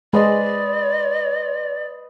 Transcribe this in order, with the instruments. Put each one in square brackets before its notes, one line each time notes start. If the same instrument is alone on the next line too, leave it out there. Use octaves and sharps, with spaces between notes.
[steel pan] G#3 [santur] B4 C5 D#5 [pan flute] D5